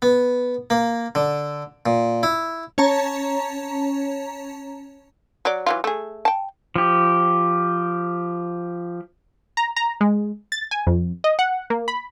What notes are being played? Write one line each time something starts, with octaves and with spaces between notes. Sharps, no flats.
B3
A#3
D3
A#2
E4
C#4 C#5 A5 A#5
F#3 D5
E3 F#3 F4
A3 G#4
G5 A5
F3 G4
A#5
A#5
G#3
A6
G#5
F2
D#5
F#5
A#3
B5